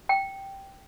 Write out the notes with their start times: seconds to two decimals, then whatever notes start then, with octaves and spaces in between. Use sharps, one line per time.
0.09 G5